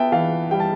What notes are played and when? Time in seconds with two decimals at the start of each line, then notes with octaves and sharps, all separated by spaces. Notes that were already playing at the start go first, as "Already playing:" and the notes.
Already playing: B3 E5 G5 A5
0.12 E3 F5 A5
0.51 G3 G5
0.60 A5